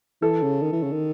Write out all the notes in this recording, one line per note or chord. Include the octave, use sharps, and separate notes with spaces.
E3 A4
C#3
D#3
E3
C#3
D#3